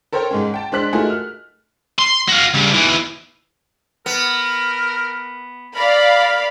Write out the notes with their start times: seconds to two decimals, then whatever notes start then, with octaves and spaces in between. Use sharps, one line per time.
0.12 A4 A#4 C5 C#5 G5
0.31 G#2 G#3 C#4
0.54 G5 A5
0.72 G#3 D4 C5 F#6 B6 F#7
0.93 A3 D#4 F4 F#4 G#4 A#4
1.10 F6
1.99 C6
2.28 F#4 F5
2.54 C#3 G3
2.74 B1 E3
4.06 B3 A#4
5.75 A#4 D5 F5 B5